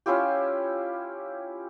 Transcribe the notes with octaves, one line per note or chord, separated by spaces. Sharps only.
C#4 E4 F4 G4